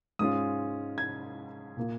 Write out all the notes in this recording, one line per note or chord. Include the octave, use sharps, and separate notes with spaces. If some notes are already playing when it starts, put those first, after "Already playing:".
G#2 G#3 C#4 F4 D#6
G#6
A#2 A#3 F4